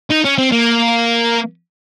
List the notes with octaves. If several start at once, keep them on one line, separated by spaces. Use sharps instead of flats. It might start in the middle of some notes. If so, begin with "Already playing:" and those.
D#4
C#4
C4
A#3